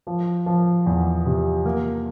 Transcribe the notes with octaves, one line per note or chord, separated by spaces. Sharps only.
F3
F3
E2
C3
A#3